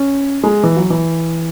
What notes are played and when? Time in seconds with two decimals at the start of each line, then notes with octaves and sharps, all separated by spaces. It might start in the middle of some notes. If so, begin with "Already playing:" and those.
Already playing: C#4
0.43 G#3
0.64 E3
0.77 F#3
0.90 E3